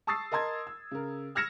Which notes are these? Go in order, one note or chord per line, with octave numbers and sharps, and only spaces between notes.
A5 C#6 D#6 E6 A6 C7
A#4 D#5 A5 C6 G#6
E6
C#3 A#4
E6 F6 G#6 A#6 C#7 E7